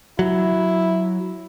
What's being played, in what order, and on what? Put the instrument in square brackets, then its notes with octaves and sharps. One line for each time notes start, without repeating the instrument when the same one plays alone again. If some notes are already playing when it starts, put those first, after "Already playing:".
[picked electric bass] F#3 [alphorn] E4